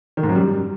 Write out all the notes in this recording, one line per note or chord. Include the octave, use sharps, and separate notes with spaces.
D#3
G#2
F#2
G3